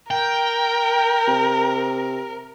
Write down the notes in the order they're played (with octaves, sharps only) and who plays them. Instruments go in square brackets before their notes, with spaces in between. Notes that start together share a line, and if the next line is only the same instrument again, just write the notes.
[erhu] A#4 [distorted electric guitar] G5
[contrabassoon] C3